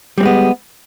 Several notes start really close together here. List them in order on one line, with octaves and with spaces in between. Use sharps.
G3 C4 G#3 B3